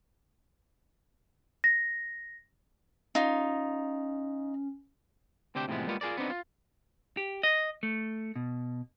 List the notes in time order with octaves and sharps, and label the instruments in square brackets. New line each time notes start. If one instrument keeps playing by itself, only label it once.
[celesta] A#6
[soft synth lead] C#4 [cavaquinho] D#4 F4
[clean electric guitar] D2 C3 C4 D4 G4 G5
A2 C3 E3 F3 G#3 B3
G3 G#3 A#3 B3 F4
F4 G#4 A#4 D5
B3 C4 D4 D#4
F4
G4
D#5
A3
B2